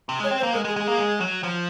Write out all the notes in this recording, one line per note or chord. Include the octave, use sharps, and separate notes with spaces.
C3
G#3 C#5
C4
C5
A#3
G#3 A#4
G#3
G#4
G#3
A#3 G#4
G#3
F#3
F3